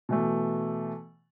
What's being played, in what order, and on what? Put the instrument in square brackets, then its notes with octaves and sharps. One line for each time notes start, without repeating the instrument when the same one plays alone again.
[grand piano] B2 E3 A3